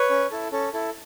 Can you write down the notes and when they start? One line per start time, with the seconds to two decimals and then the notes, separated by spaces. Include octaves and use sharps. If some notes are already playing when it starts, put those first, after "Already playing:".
Already playing: B4 C#5
0.10 C#4
0.31 E4 A4
0.52 C#4 A4
0.73 E4 A4